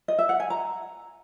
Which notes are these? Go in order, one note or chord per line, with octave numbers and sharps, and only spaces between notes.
D#5
E5
F#5
G#5
A#5